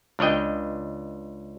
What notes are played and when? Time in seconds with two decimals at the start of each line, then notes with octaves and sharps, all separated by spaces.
0.19 C#2 D4 C#5 D#5 G5